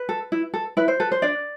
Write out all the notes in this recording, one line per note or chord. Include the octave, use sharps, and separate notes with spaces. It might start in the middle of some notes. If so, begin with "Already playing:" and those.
Already playing: B4
A4
E4
A4
E4 B4
C5
A4 B4
C5
D4 D5